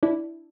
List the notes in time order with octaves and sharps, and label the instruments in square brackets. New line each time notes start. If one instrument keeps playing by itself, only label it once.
[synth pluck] D4 E4